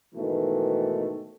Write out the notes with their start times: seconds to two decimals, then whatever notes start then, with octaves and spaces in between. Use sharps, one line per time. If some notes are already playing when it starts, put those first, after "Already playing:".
0.15 G#2 B2 D#3 E3 A3